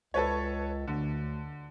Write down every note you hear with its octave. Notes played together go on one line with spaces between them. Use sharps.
C#2 A4 B4 C#5
D2 D3